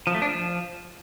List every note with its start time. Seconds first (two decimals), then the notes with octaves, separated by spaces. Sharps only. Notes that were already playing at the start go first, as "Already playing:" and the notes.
0.07 F3
0.14 A3
0.22 D4
0.29 F3